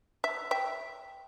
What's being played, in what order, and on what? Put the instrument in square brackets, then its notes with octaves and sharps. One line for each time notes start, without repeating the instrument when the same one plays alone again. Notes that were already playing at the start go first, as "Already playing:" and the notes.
[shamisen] E5
E5 G5